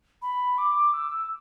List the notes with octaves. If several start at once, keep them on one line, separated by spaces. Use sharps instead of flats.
B5
D6
E6